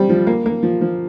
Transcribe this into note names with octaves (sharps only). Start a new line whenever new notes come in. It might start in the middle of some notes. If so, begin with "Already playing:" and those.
Already playing: G3 C4
F3
A#3
A#3
F3
F3